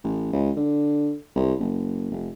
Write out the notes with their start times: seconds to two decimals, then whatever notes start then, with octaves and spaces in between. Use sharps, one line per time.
0.04 A1
0.33 C#2
0.57 D3
1.36 C2
1.59 F#1
2.12 F1